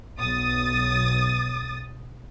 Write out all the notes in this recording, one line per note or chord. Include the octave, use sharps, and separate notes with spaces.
B1 D#6 A6